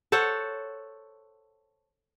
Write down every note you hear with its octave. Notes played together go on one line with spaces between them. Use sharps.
A4 C5 C#5 F#5